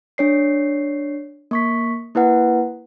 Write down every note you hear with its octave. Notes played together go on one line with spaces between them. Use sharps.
D4 C#5 C7
A#3 C#6 B6
A#3 E4 B4 F#5